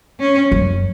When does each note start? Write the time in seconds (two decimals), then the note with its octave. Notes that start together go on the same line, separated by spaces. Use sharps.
0.20 C#4
0.52 F#2